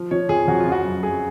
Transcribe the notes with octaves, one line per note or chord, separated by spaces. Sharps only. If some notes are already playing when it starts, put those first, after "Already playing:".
Already playing: F3
F3 C#5
F2 G#4
F2 F#4
F4
C#3
F#4
F#2
F#3 G#4